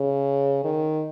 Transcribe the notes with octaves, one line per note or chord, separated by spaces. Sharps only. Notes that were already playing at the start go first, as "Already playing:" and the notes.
Already playing: C#3
D#3